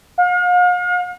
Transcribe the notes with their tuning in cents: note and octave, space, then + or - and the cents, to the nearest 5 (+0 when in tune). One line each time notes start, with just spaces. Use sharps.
F5 +40